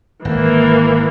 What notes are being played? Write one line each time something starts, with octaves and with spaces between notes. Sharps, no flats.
G#1 E3 A#3